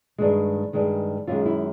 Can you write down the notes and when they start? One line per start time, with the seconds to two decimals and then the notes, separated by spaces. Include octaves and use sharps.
0.18 G2 D#3 G#3
0.73 G2 D#3 G#3
1.27 F#2 D#3 G#3 F4
1.46 E4